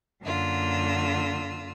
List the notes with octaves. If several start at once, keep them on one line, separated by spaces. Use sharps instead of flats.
F#2 D3 A#3 F4 E6